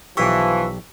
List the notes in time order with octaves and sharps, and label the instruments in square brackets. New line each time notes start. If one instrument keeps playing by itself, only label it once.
[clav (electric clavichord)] B1 G4 [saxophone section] E3 [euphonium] F3 [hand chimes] C#6 E6 B6